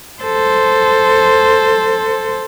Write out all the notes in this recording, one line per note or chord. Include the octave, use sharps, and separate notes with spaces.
A4 C5